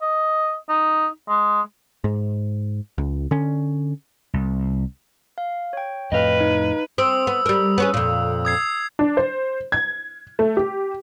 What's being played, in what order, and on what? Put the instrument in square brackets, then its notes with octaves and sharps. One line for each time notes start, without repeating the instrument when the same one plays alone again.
[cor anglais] D#5
D#4
G#3
[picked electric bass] G#2
C#2
D3 C#4
[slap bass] C2
[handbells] F5
C#5 G5
[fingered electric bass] F2 A2 [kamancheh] B4 [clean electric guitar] D#5 F5
[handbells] D#4
[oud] C4 [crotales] D#6 E6
[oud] B3
G3 A#4
B3 C#4 G#4
F2 A#2
[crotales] D#6 G#6 C7
[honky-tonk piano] D4
C5
G#6
A3
G4